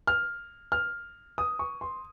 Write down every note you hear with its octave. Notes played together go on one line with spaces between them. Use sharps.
F6
F6
D#6
C#6
C6